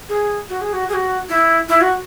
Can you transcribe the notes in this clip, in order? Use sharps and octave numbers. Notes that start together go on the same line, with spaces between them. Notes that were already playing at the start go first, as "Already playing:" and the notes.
G#4
F#4
G#4
F#4
G#4
F#4
E4
E4
F#4